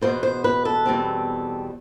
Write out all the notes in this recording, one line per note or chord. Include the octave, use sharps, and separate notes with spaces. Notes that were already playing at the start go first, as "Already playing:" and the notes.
E2 B2 B3 C5
C5
B4
A4
E2 B2 G3 C4